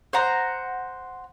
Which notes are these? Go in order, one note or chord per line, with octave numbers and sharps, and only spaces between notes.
C5 F#5 A#5